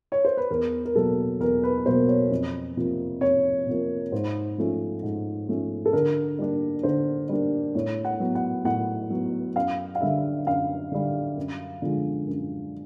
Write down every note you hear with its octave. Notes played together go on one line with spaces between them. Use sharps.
C#5
C5
B4
E2 A#4
A#4
B2 F#3 A#3 A4
E2 A#4
B4
B2 F#3 A#3 C5
C#5
F2
C3 F3 A#3
F2 C#5
C3 F3 A#3
G#2 C5
F3 A3 C#4
G#2
F3 A3 C#4
A4
D3 A#4
G3 A#3 D4
D3 C5
G3 A#3 D4
A2 C#5
F#5
F#3 B3
F#5
A2 F#5
F#3 B3
F#2 F5
F5
D3 G3 E5
F#2 F5
D3 G3
F#2
D3 F3 G#3
F#2